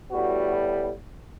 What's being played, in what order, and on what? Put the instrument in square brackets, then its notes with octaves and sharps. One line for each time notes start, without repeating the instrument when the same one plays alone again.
[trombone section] A2 G3 B3 F#4